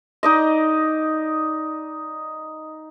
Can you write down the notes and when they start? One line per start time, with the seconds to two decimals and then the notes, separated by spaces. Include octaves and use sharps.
0.23 D#4 D5 D#5